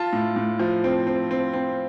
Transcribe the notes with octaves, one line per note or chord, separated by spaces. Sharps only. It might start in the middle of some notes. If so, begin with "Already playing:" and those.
Already playing: F4 A5
A2
A2
F3
C4
C4
C4
C4